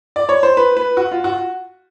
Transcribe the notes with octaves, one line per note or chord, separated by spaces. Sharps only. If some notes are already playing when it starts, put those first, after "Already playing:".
D5
C#5
C5
B4
B4
F#4
F4
F#4